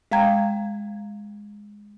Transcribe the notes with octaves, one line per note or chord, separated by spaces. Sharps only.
G#3 F5 G5 A#5 G#6